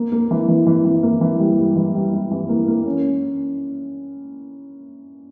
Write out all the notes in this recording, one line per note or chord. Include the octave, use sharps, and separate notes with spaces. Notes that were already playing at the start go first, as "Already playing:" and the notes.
Already playing: A#3
A#3
E3
E3
E3
E3
A#3
E3
G3
G3
E3
G3
E3
E3
A#3
A#3
C#4